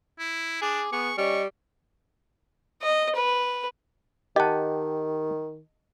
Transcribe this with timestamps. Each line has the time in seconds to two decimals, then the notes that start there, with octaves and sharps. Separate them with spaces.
0.19 E4
0.62 D4 G#4 D6
0.93 B3 G#4 C#6
1.18 G3 C#4 D#5 C#6
2.82 D#5
3.15 B4
4.36 D#3 G4 D#5 F#5 A5